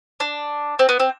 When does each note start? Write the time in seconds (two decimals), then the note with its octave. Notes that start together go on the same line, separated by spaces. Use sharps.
0.20 D4
0.79 C4
0.89 B3
1.00 C4